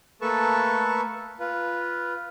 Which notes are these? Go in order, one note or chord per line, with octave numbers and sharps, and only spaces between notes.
A3 A#3 A4 B4 A5 C#6
F4 B4